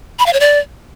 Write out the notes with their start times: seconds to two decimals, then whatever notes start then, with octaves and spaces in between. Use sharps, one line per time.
0.19 B5
0.26 F5
0.33 C#5
0.40 D5